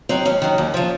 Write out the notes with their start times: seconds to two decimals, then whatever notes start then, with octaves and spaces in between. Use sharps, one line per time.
0.09 D#3 F#3 C4
0.25 D#2 C#4
0.42 D#3 F#3
0.58 D#2
0.74 C#3 F3